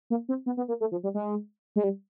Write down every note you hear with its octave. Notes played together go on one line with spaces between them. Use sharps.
A#3
C4
B3
B3
A#3
A3
F3
G3
G#3
G#3
G3